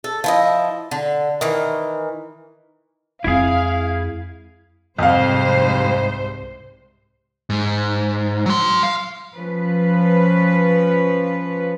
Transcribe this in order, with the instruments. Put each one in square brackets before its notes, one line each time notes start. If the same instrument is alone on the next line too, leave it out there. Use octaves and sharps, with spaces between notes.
[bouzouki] A4
F3 E4 D#5
D3
D#3 E3
[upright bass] F2 G#3 [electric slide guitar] E4 G#4 [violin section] F5
[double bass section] C2 C3 [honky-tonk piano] F2 F5 [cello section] G#2 C5
[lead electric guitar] G#2
F#3 C6
F5
[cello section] F3 C#4 B4